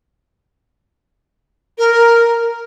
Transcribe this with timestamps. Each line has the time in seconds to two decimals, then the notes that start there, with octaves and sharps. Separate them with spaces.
1.78 A#4